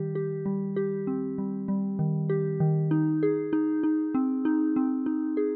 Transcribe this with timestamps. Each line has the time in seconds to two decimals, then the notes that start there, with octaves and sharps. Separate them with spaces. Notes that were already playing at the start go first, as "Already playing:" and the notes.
Already playing: D#3 G3 G4
0.15 G4
0.46 G3
0.76 G4
1.07 C4
1.38 G3
1.68 G3
1.99 D#3
2.30 G4
2.60 D#3
2.91 D#4
3.23 G#4
3.53 D#4
3.83 D#4
4.14 C4
4.45 D#4
4.76 C4
5.06 D#4
5.37 G#4